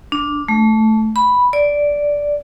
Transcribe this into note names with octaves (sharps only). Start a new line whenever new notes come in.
D4
A3
B5
D5